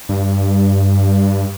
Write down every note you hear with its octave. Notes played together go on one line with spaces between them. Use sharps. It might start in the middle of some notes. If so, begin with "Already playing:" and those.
G2